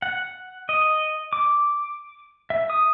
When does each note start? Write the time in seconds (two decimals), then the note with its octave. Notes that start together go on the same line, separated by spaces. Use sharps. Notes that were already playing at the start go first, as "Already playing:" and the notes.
0.02 F#5
0.69 D#5
1.33 D6
2.50 E5
2.70 D#6